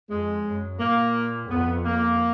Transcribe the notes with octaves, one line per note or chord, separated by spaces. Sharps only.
F2 G#3
F#2
A#2 A#3
F2 B3
A#3